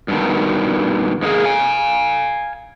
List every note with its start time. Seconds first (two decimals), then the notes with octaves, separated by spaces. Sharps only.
0.08 G2 B2 D#3
1.22 G#2 G#3 A#3 G#4
1.45 F5 G#5